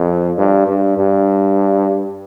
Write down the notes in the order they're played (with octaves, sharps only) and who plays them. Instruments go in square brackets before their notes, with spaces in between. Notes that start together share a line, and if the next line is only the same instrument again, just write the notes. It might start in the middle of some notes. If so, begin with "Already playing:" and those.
Already playing: [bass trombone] F2
G2
G2
G2